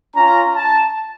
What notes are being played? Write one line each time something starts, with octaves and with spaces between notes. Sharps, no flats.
C#4 F4 A#5
A5